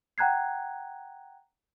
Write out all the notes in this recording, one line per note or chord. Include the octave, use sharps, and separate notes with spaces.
F#5 G5 A#5 F#6 G#6 C7